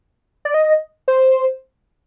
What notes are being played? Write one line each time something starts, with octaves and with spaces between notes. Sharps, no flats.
D5
D#5
C5